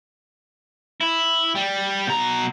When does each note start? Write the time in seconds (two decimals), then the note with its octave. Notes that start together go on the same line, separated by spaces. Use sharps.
1.01 E4
1.55 G3
2.07 B2 A#5